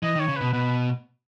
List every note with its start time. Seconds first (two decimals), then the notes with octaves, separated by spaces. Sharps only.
0.03 E3 D#5
0.15 D#3
0.20 C#5
0.28 C#3
0.36 B2 B4
0.53 B2 B4